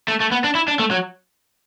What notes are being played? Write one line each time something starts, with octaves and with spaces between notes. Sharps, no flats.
A3
A3
B3
D4
E4
D4
A3
F#3